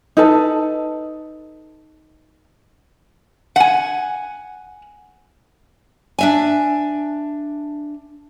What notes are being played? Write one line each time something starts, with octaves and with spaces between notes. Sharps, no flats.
D#4 A4 B4 A5
F#5 G#5
D4 E5 G#5